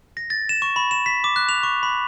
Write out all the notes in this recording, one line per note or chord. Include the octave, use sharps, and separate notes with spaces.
A#6
A6
E7
C#6
B5
E7
B6
D6
F#6
F7
C#6
B5